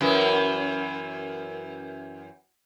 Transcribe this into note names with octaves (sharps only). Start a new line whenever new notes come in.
F#2 E3